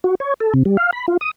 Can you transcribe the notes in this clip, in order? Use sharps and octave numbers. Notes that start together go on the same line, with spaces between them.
F#4
C#5
A4
C3
G3
F5
B5
F4
D#6